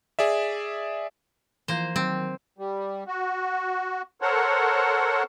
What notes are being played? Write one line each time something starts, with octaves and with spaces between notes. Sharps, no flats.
G#4 D5 E5
E3 F3 A#3 C5
D#3 F#3 C4
G3
F#4
A4 A#4 C5 C#5 F#5